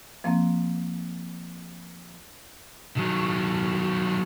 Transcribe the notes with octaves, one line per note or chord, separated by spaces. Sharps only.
F3 A#3 C4
D#3 F#3